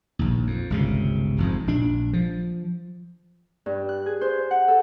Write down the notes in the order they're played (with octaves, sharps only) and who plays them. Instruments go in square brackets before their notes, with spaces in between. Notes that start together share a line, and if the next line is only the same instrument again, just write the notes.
[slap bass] A#1 D#2
F2
G1 C#2 C3
G#1 F2 G#2
A#1 D4
F3
[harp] G2
F#6
G#4
C5
F#5
A4